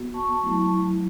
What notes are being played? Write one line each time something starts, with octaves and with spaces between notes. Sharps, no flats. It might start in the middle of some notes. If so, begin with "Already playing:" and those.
Already playing: B3 F#4
A5 C#6
F#3 A3 E4